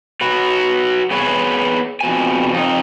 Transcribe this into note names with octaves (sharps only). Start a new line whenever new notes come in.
F#3 F#4 B4
B3 G#4 B4 C#5
F2 B2 G#5
F2 D#4